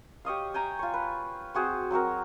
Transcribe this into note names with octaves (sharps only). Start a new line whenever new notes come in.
G4 C#5 D#5 F5
E5 G5 G#5 A#5
F4 C#5
B4
C4 F#4 G#4 C5
F#3 C4 F#4 A#4